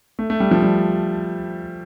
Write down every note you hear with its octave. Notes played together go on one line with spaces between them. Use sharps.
A3
A3
G3
F3
G3